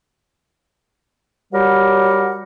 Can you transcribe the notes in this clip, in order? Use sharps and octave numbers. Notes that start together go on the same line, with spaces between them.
F#3 G3 G4 A#4 F#5